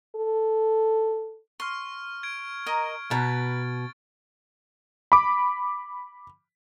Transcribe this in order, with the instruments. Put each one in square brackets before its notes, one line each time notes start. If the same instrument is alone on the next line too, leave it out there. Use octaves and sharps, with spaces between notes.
[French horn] A4
[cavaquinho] C6 [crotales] C#6 F6
[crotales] G#6 D7
[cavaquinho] A#4 D#5 A#5
[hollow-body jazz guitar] B2 [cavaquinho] B4 A#5 [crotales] A6
[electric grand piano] B5 D6